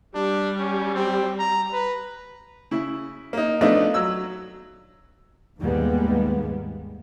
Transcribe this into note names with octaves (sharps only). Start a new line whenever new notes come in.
G3 D4
C#4
C4
A#5
B4
C#3 E4
A#3 D#4
F3 A3 B3 D4 D#4 F4
F#3 E6
D#2 G#2 G3 G#3 A#3 B3